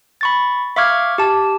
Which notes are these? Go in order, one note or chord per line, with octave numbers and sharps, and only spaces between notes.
B5 C#6 A6
E5 F5 C#6 D6 F6 G#6
G4 A5